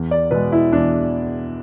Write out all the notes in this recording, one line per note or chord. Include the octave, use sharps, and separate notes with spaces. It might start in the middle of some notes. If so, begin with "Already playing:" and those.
Already playing: E2
D5
B2 G#3 B4
E4
E2 D4